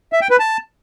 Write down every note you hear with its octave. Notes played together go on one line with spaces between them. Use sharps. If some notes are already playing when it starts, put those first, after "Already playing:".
E5
G5
B4
A5